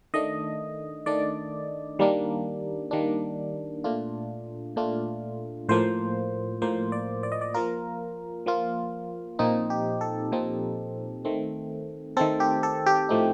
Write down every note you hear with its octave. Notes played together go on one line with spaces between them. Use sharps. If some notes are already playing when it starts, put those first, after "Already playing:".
D#3 A3 D4 D#5
D#3 A3 D4 D5
D#3 G3 A#3 D4
D#3 G3 A#3 D4
A#2 A3 D4 F4
A#2 A3 D4 F4
A2 F3 A#3 C5
A2 F3 A#3 C5
D5
D5
D#5
D5
F3 A#3 F4 A#4
F3 A#3 F4
A#2 F3 C4 D#4
G4
A4
A#2 F3 C4 D#4
D#3 A3 C4
D#3 A3 C4 A4
G4
A4
G4
A2 F3 A3 C4 D#4